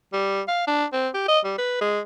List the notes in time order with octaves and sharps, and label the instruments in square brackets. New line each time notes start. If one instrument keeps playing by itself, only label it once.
[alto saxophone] G3
F5
D4
C4
G4
D#5
G3
B4
G#3